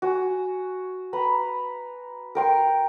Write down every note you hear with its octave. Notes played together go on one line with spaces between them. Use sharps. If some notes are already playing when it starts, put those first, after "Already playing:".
F#4 G#5
B4 A#5 B5
A#4 G5 C6